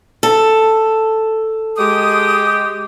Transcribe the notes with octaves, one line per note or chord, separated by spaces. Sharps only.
A4
G#3 G4 D#6